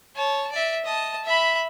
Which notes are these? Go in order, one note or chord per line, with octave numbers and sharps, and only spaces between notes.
C#5 A5
D5 E5
D#5 A5
E5 B5